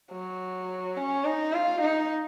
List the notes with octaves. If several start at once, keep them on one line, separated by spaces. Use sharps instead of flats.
F#3
C#4
D#4
F4
D#4